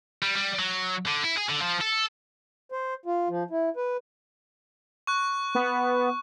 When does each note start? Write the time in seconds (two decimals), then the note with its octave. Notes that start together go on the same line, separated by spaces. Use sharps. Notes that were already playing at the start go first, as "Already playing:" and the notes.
0.23 G3
0.36 G3
0.59 F#3
1.06 D3
1.23 E4
1.37 G#4
1.49 D3
1.61 F3
1.81 A4
2.72 C5
3.06 F4
3.29 F3
3.50 E4
3.77 B4
5.07 C#6 F#6
5.55 B3